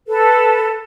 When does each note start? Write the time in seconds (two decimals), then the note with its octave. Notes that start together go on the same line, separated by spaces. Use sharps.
0.07 A4 B4